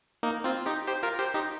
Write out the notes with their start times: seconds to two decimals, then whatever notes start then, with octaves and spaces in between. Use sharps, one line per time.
0.23 A#3 D#4
0.44 C4 F4
0.66 D#4 G4
0.87 G4 C5
1.03 F4 A#4
1.19 G4 C5
1.34 D#4 G4